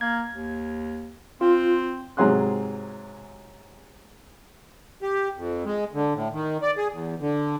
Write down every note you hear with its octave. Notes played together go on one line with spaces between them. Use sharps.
A#3 G#6
D#2
C4 F4
G#2 C3 F#3 G#4 C6 F#6
G4
F2
G#3
D3
A2
D#3
D5
G#4
E2
D3